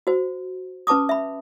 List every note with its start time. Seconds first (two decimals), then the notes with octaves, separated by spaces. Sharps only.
0.07 F#4 C5
0.87 C#4 B4 A5 D6 D#6
1.09 E5 B5